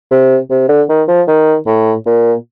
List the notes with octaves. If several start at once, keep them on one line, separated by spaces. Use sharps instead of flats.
C3
C3
D3
D#3
F3
D#3
A2
A#2